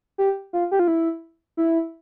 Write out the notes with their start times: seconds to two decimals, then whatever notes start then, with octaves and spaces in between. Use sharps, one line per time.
0.18 G4
0.53 F4
0.71 G4
0.79 F4
0.88 E4
1.57 E4